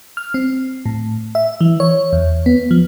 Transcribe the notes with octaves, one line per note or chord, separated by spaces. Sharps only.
F6
C4
A2
E5
E3
C#5
E2
B3
F3